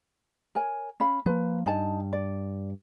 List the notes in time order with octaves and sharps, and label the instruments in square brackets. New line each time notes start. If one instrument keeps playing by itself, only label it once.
[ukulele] A#4 C#5 G#5
C#4 F5 B5
[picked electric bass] F3 A#3 [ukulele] B4
[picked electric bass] G2 [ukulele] D#4 G#5 A5
[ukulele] D5